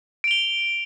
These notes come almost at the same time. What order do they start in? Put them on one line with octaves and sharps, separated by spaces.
D7 F7 G7